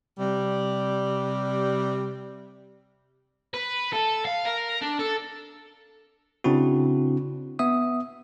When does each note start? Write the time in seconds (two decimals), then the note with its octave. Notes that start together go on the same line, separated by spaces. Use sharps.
0.19 C3 G3
3.54 B4
3.93 A4
4.25 F5
4.45 A#4
4.82 D4
4.99 A4
6.44 C#3 C4 D4 E4 F#4
7.59 B3 E5 D#6